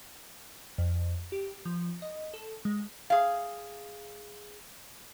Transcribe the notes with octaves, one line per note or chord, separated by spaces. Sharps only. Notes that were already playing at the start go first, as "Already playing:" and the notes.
F2
G4
F3
D#5
A4
G#3
G#4 F5